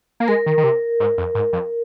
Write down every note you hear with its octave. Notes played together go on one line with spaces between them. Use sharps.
A#3
G#3 A#4
D#3
D#3
C3
G#2
F2
G#2
F2